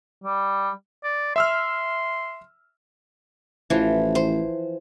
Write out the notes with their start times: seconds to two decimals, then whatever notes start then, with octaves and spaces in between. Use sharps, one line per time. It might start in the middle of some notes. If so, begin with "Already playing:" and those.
0.24 G3
1.04 D5
1.36 E5 C6 E6 F6
3.70 A1 E3 F3
4.15 C5